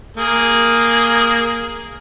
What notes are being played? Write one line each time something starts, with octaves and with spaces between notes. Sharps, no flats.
A#3 G#4